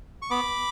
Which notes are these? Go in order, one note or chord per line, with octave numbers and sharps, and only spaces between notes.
C#6
B3 B5 D6